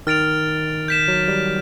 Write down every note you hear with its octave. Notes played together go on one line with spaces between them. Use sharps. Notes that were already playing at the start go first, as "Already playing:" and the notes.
D#3 F6 A6 D7 F7
G6 B6 E7
F#3
G3